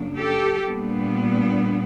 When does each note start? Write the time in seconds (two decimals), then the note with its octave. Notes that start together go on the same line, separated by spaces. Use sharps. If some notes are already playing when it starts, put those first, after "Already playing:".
Already playing: F#2 C#3 F#3 A#3 D4
0.17 G4 A4
0.64 A#2 G3 B3 D4